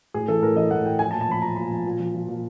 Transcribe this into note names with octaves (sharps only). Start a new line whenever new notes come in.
A2 G#4
E3 A4
A2 A#4
E3 D#5
A2 F#5
A2 G5
F3 G#5
A#2 A5
A5
F3 B5
F3 A#5
A#2 B5
F3
A#2
F3
F3
A#2